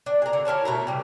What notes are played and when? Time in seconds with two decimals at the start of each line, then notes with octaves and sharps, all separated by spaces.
0.06 D4
0.22 G#4 A#4
0.33 D3
0.45 E4 A#4 C#5 A5
0.65 B2 A3 A#4
0.87 C3 G3